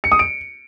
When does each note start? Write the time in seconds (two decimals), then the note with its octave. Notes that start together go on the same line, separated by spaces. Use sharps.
0.04 C#7
0.12 D#6
0.19 D7